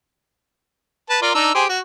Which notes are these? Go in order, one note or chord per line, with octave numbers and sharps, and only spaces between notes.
B4 A5
F4 A#4 D5
D4 D#4 E6
G4 G#4 C5
F#4